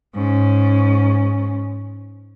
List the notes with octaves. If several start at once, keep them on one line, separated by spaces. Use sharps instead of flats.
G#2 C#4